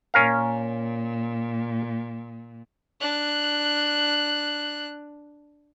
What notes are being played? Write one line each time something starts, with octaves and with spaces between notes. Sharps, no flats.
A#2 C#4 A#4 F5
D4 F#6